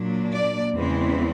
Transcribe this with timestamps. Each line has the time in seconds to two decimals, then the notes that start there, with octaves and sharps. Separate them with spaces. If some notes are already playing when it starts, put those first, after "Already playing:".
Already playing: A#2 F#3 A#3 D4
0.32 D5
0.76 E2 C#3 E3 G#3 C4